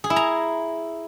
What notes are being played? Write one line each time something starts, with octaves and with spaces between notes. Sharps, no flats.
G#4
E4
A#5